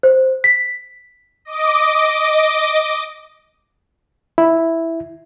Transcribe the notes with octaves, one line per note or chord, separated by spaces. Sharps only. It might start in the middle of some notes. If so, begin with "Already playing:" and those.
C5
B6
D#5 D6
E4